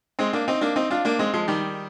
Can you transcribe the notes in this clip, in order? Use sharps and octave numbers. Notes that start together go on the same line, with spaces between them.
G#3 C4
A#3 D4
C4 D#4
A#3 D4
C4 D#4
D4 F4
A#3 D4
G#3 C4
F3 G#3
D#3 G3